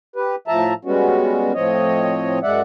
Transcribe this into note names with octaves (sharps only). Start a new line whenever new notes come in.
G4 B4
A2 F3 E5 A5 A#5
G3 G#3 B3 C#4 F#4
A2 F3 C4 C#5 D#5
F#2 G#3 D5 E5 F#5